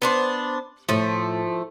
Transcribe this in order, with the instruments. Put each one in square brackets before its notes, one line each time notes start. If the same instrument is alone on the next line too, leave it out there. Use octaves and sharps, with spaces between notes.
[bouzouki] B3 D4 C5
[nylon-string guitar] A2 [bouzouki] F3 A3